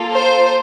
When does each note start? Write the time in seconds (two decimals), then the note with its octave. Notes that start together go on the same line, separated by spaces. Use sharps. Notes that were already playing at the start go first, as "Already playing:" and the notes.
Already playing: A#3 F4 A4
0.12 C5